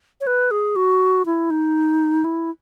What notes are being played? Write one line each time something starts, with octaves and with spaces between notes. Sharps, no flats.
C#5
B4
G#4
F#4
E4
D#4
E4